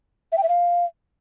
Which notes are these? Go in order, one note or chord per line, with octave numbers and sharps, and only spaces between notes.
E5
G5
E5
F5